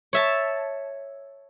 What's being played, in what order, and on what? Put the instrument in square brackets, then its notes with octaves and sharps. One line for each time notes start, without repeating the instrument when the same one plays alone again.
[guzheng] C#5 E5 A5